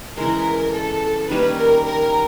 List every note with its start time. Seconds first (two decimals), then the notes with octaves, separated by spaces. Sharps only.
0.17 C#3 E3 G#3 A#4
0.74 A4
1.30 D#3 G3 A#3 C#4 B4
1.58 A#4
1.86 A#4